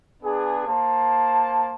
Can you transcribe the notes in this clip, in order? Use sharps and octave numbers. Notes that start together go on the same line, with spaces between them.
B3 D4 G#4
A#3 C5 A5